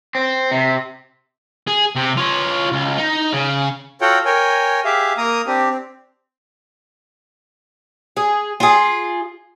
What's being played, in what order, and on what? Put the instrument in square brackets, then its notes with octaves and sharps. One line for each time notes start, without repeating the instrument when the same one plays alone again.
[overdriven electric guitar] C4
C3
[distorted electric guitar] G#4
C3
F4 C#5
C#2
D#4
C#3
[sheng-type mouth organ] F4 F#4 A4 C#5 F#5 G5
A#4 C#5 G5 G#5
G4 G#4 E5 F5
A#3 A#4 A#5 D#6
C4 D4 G4
C4
[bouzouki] G#4
F4 G#4